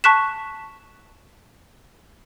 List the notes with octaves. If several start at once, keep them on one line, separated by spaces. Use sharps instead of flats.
A5 C#6 F#6 B6 E7